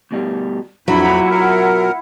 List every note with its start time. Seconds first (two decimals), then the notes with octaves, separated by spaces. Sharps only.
0.11 D2 B2 G3
0.88 F2 F3 F#3 D4 E4 F#5 B5
1.05 B1 F4 A#5
1.30 A#4